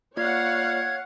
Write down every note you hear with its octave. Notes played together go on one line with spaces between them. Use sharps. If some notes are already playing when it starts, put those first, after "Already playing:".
A#3 F4 C#5 D5 F5 F#5 G#6